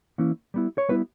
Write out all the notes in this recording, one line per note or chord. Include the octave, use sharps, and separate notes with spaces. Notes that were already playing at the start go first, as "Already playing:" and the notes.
E3 A#3 C#4 E4
G3 B3 E4
C#5
G3 B3 E4 B4